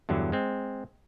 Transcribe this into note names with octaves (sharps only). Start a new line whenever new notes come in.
E2 G2 D3 F#3
G#3 C4